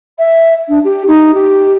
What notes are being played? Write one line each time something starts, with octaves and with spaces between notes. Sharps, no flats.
E5
D4
G4
D#4
G4